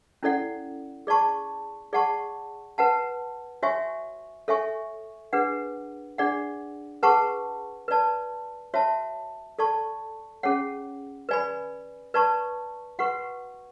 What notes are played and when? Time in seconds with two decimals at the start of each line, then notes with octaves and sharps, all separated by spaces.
0.23 C#4 E4 A4 D5 F#5
1.07 G#4 D5 A5 C#6
1.93 G#4 D5 F#5 A5 C#6
2.78 B4 F#5 A5
3.63 F#4 C#5 E5 G#5 C#6
4.48 A4 C#5 E5 G#5 C#6
5.33 D4 G#4 B4 F#5
6.18 D4 G#4 D5 F#5
7.03 G#4 B4 F#5 A5 C#6
7.88 B4 D5 A5
8.74 F#4 C#5 E5 A5
9.59 A4 D5 A5 C#6
10.43 C#4 G#4 C#5 F#5
11.29 B4 D5 G#5 B5
12.14 B4 D5 A5 C#6
12.99 F#4 B4 F#5 C#6